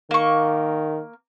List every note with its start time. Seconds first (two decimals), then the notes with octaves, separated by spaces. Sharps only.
0.11 D#3 A#3 C#6